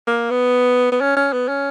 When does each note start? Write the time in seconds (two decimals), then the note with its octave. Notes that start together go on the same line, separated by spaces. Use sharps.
0.07 A#3
0.31 B3
0.92 B3
1.01 C#4
1.17 C#4
1.33 B3
1.48 C#4